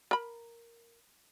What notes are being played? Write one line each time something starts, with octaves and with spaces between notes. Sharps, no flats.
A#4 B5